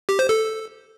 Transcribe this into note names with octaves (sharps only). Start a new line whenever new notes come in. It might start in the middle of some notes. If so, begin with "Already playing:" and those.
G4
C5
A4